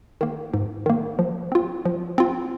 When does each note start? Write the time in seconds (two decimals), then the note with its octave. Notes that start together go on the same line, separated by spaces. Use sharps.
0.21 D#3 A#3
0.54 G#2
0.86 D#3 A#3
1.19 F3
1.52 C4 F4
1.85 F3
2.18 C4 F4